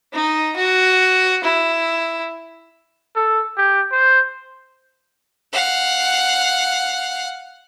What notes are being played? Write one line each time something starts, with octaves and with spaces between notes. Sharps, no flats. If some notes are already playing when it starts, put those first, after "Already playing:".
D#4
F#4
E4
A4
G4
C5
F5 F#5